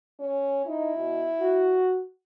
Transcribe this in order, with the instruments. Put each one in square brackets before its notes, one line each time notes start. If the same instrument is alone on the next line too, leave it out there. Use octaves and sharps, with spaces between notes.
[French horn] C#4
[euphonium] D#4 [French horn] E4
[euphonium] B2
F#4